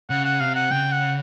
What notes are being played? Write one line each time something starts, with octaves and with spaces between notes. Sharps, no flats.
C#3 F#5
F#5
C3 F5
F#5
C#3 G5
F#5